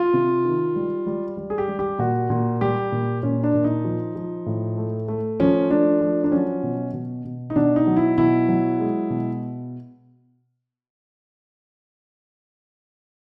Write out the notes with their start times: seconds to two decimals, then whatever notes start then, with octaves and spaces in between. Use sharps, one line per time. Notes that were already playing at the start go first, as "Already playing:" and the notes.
Already playing: F4
0.13 C3
0.45 D#3
0.76 G3
1.07 G3
1.37 G3
1.50 G#4
1.58 G4
1.68 G3
1.79 G4
1.99 A#2 F#4
2.30 A#2
2.61 G3 G4
2.92 A#2
3.23 A#2 C#4
3.44 D4
3.54 A#2
3.64 D#4
3.85 F3
4.16 F3
4.46 A2
4.78 A3
5.08 A3
5.40 F3 C#4
5.71 A3 D4
6.01 F3
6.24 D4
6.32 F#3 C#4
6.63 B2
6.93 B2
7.25 B2
7.50 D#4
7.56 B2 D4
7.76 D#4
7.87 F#3
7.96 E4
8.18 B2 E4
8.49 F#3
8.80 G#3
9.10 B2